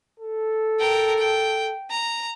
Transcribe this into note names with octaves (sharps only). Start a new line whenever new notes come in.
A4
A#4 G5
G5
A#5